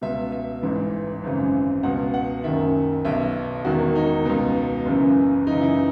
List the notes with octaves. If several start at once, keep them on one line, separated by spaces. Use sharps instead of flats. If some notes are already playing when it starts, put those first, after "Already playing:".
C#2 B2 E5
E5
A1 G#2 E3
G#1 F#2 C#3 E3
C#2 B2 F#5
F#5
F#1 F#2 D#3 E5
B1 B2 E5
E1 E2 D#3 F#4
D#4
C#2 B2
F#1 F#2 C#3 E3
F#1 F#2 C#3 E3 D#4
E4